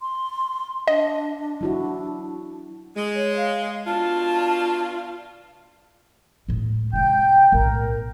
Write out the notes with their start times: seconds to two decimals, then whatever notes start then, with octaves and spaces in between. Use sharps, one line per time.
0.01 C6
0.88 D4 D#5
1.61 F#3 E4 F#4
2.97 G#3
3.15 C#5
3.37 F5
3.87 B2 D4 F4 A5
6.48 A2 G#3
6.93 C3 G#3 G5 G6
7.52 B1 A2 A#4